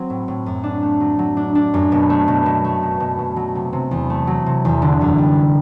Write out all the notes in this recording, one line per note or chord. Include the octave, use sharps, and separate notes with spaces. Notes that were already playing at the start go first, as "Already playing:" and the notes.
Already playing: F#3 C4
A2
A2
F#2
D4
A3
F#3
F#3
D4
D4
F#2
B2
A3
B2
B2
A3
B2
B2
B2
F#3
C3
C3
E2
A3
F#3
C3
E2
D3
F#2
G3